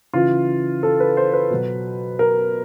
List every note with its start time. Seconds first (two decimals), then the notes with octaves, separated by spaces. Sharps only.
0.13 C#3 E3 F4
0.83 A4
1.00 B4
1.17 C5
1.33 B4
1.51 B2 F#3
2.19 A#4